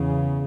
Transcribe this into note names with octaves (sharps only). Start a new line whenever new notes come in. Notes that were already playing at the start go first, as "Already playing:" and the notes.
Already playing: E2 C#3